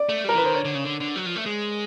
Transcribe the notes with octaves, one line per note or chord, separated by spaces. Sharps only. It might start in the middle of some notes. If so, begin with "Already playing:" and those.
Already playing: D5
A3
G3
A#4
E3 B4
D#3 C5
D3 C#5
D3
C#3
D3
D3
F#3
F3
A3
G#3